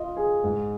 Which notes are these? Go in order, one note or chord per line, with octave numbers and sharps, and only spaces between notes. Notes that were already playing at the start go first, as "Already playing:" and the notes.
Already playing: F4 D#5
G#4
G#2